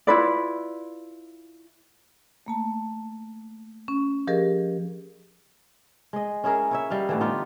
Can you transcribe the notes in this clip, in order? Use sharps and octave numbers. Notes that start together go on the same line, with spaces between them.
E4 F4 B4 D5
A3 A#3 A5
C#4
F3 G4 G#4 A#4 D#5
G#3 D#5
C#4 E4 G#4 A#4
E4 C#5 E5
G3 D#5 F5
A2 D3 E3
B3 D#4 F4 G4